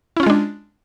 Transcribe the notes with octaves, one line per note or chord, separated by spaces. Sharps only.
G#3 C#4 D4 E4 F4